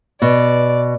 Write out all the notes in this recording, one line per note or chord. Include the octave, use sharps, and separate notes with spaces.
B2 D5